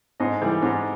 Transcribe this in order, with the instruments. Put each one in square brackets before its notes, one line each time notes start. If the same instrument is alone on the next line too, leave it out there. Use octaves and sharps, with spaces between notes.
[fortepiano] G#2 D#5
E3 G3
G#2